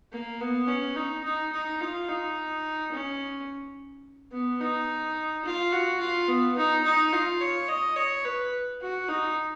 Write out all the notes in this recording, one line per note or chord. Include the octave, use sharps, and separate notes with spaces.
A#3
B3
C#4
D#4
D#4
D#4
F4
D#4
C#4
B3
D#4
F4
F#4
F4
B3
D#4
D#4
F4
C#5
D#5
C#5
B4
F#4
D#4